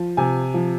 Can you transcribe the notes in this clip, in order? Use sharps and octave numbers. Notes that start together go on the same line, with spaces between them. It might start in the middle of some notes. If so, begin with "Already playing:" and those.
Already playing: F3
C3 G#5
F3